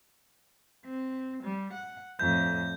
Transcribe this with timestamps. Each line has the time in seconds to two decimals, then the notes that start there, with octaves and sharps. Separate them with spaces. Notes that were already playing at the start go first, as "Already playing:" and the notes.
0.85 C4
1.43 G3
1.73 F#5
2.19 F2 A2 G6